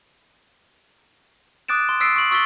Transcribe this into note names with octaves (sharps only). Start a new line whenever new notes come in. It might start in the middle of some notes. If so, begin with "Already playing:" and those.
D6 D#6 F#6 A6 D7 E7
C6
D#6 E6 A6 B6 C7 D7
C#6 D7 F#7
C#6 E6 A6 B6 G7